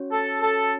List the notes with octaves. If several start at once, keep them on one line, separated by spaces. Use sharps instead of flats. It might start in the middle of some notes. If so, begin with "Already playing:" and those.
Already playing: C#4 F#4 C#5
A4
A4